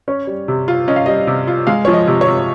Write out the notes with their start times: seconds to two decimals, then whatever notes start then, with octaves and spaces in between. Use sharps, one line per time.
0.08 C#4 C#5
0.27 G3
0.48 C3
0.68 F4
0.88 C#4 D#5
0.96 F5
1.06 G3 D#5
1.27 C3
1.47 F4
1.67 G#3 F5
1.85 F3 C#5
1.94 D#5
2.07 C3
2.21 C#5
2.27 C3